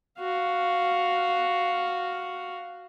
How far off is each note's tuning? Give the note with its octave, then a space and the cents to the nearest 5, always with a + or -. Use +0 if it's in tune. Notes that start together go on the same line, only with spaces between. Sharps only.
F#4 +0 F5 +0